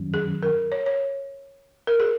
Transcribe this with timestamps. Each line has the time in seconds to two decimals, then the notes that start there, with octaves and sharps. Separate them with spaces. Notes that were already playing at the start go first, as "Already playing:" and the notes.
Already playing: F#2 D#3 F#3 C#4
0.14 G#4
0.43 A#4
0.72 C#5
0.86 C#5
1.87 A#4
2.00 G#4